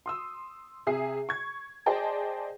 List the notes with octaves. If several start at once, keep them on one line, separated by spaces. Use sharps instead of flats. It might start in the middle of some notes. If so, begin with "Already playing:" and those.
C6 D#6 E6
C3 G#4 E5 D#6 C7
C#6 G#6
G#4 C5 D5 D#5 G5 A5